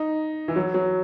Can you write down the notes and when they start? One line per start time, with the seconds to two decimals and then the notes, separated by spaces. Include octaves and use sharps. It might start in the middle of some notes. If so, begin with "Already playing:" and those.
Already playing: D#4
0.48 E3
0.56 F#3
0.74 F#3